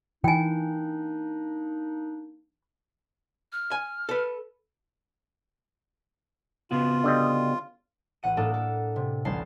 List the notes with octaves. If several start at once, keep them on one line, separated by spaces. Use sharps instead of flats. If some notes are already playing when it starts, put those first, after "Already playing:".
E3 A#3 D4 D#4 G5 G#5
F6
G#5
A4 B4
C#3 B3 F4 F#4
D3 G3 D#5
A1 F#5 D#7
A2 A#3 D4 G#4 A4
A4
C3
A1 D2 G3 C#4 A5 C7